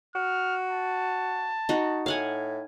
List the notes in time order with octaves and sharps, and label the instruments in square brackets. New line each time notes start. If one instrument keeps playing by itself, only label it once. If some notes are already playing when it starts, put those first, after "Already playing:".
[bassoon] F#4 [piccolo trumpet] F6
[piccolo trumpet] A5
[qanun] D#4 F#4
[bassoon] A2 [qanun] F5 F#5 G#5